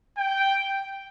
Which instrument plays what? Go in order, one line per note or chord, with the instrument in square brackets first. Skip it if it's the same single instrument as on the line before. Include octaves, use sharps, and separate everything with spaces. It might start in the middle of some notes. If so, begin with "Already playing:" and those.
[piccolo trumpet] G5